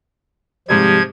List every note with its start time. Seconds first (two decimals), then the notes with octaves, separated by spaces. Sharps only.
0.68 G#2 C3 F3 G3 G#6